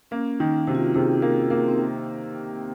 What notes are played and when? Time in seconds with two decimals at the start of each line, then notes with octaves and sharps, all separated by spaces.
0.11 A#3 C#4
0.40 D#3 D#4
0.67 C3 F#4
0.75 F4
0.82 F#4
0.94 C3 G#4
1.22 A#3 A#4
1.50 A#3 A#4
1.68 C4